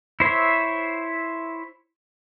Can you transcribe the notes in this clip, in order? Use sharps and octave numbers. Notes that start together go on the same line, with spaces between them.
E4 C5 C#5 E5